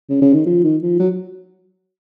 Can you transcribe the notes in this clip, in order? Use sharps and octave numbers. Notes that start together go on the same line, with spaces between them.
C#3
C#3
D#3
F3
D#3
F3
F#3